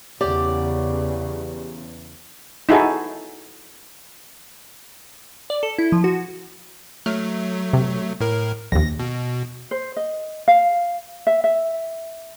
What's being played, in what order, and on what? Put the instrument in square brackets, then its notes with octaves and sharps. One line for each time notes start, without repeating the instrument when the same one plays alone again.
[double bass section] E2 C#3 [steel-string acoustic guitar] G4 D5 F#5
[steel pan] D#4 E4 F#4 G#4 A4
[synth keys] D5
A4
E4
F3
F#4
[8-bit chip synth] F#3 A3 [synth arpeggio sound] F6
[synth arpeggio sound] C3
[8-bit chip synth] A2 A#4
[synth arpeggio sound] A#1 D#2 [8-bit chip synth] A#6
[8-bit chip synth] B2
[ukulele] C5
D#5
F5
E5
E5